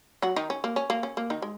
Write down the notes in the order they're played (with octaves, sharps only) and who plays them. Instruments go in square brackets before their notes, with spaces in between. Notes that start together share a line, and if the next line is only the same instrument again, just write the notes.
[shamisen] F#3 F#4
D#3 D#4
C#4
A#3
C#4
A#3
C#4
A#3
D#3 D#4
G#3